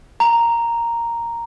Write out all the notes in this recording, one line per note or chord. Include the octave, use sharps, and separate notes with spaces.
A#5